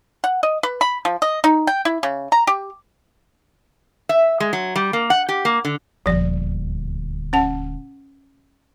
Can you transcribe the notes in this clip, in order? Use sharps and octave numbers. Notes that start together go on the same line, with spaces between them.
F#5
D#5
B4
B5
F3
D#5
D#4
G5
E4
C#3
A#5
G4
E5
G#3
F#3
G3
A#3
F#5
G4
A#3
D3
D#1 D2 F3 D5
C#4 F#5 A5